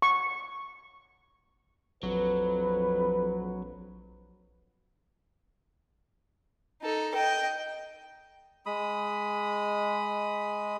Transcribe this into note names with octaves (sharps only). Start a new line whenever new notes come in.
C#6
A#1 F2 F#3 B4
D#4 A4
D#5 G5
G#3 B5 D#6